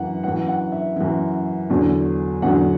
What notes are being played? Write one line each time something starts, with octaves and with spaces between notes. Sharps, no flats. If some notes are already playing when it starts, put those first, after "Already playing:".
Already playing: F#2 E3 F#5
F#2 E3 F#5
F#5
E5
F#2 E3
E2 D3 F#3
E2 D3 F#3 F#5